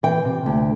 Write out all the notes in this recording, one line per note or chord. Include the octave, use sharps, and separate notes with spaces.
E3 G5
C3
D2